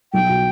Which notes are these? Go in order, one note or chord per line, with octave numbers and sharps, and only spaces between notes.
B1 G5
B2